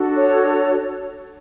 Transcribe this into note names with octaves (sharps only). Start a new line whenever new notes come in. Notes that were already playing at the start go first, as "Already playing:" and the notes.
Already playing: D4 F#4 A4
C#5